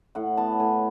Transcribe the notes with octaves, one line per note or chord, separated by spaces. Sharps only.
A2 F#5
B3 A5
A2 G#5